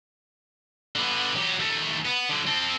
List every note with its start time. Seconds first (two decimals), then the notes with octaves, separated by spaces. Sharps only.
0.95 D3 B3
1.36 F#3 G4
1.59 D#2 A3
2.05 B3
2.29 D3 F#3
2.47 C4 A4